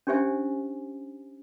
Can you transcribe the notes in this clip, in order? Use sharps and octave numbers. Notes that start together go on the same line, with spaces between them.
C#4 D4 G4 C5 E5 G#5